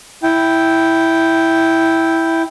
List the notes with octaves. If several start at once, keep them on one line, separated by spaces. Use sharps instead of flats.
E4 G5